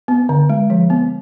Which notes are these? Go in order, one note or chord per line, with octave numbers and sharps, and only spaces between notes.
B3
D3
G#3
F3
B3